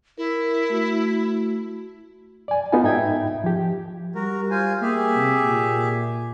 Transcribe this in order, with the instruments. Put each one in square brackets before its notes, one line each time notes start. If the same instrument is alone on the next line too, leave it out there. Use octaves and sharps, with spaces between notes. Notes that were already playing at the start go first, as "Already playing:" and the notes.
[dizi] E4 [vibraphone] A#4
[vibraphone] A3 F#4
[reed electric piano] D5 G#5
B3 D#4 F4 F#4 A4 G#5
G#2 D#4 E5 G5 G#6
F3 G4
[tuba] G3 [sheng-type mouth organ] F#4 A#4
[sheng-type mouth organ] F4 C5 G#5
[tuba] A#3 [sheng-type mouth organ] G4 G#4 E5
[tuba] C3
A#2